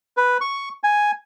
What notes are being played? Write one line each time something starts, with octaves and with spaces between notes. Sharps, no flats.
B4
C#6
G#5